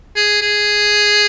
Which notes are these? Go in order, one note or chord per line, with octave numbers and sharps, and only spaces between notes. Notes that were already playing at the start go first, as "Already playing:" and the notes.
G#4
G#4